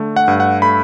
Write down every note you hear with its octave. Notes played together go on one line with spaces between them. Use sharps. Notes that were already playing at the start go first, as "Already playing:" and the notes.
Already playing: D3 A3
F#5
G2
F#5
A3 B5